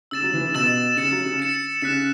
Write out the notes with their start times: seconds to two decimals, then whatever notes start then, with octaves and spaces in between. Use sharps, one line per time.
0.11 C#3 E6 A6 E7
0.22 F#3
0.34 E3
0.44 C#3
0.54 B2 E6 A6 E7
0.97 C#3 A6 C#7 E7
1.11 F#3
1.25 C#3
1.40 A6 C#7 E7
1.82 C#3 F#6 B6 E7